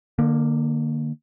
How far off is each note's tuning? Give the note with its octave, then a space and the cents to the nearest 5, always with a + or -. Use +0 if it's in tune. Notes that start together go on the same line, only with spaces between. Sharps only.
D3 +35 A#3 +0